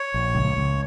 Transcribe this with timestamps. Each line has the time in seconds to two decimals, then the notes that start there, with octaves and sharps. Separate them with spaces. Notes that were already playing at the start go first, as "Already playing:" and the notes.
Already playing: C#5
0.14 A#1
0.35 C#2
0.57 C#2